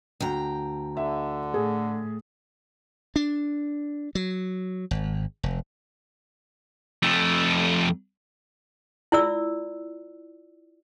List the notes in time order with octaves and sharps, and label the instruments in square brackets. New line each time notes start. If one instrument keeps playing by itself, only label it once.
[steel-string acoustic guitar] D2 G5 A#5
[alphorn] D3 [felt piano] E5
[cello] A2 [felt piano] G#4
[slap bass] D4
F#3
G#1
F1
[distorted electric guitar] F2 A3
[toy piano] E4 F4 D5 E6